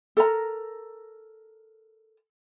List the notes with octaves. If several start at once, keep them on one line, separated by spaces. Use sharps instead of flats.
A4 A#4 A#5